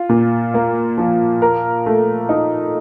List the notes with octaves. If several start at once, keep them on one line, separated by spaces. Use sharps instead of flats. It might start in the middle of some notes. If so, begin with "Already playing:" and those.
Already playing: F4
A#2
A#3
F3
A#4
A3
D#4